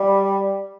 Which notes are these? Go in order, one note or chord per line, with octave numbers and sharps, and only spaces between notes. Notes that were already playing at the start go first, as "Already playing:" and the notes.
Already playing: G3